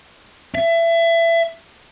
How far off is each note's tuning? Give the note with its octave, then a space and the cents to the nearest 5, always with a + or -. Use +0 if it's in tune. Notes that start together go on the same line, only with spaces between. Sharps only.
E5 +25